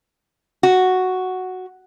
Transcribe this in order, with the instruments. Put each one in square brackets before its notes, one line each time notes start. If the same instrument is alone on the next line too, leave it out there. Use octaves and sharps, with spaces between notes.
[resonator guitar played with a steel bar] F#4